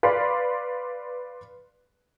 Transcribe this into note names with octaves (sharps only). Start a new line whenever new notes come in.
B4 D5 F5 B5 C6